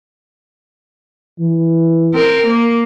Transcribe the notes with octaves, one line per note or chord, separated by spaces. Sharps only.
E3
C4 A#4
A#3